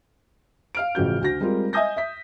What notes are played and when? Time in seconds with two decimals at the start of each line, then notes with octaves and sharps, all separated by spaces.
0.75 F5 F6 D7
0.95 A1 C#3 F3 F#4 G6
1.21 D2 F#4 A#6
1.40 G3 G#3 C4 F4 A#4
1.73 D#5 E5 G#5 D#6 G6 A#6
1.96 E5 B6